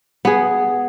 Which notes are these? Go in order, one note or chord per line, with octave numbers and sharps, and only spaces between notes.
B3 G#4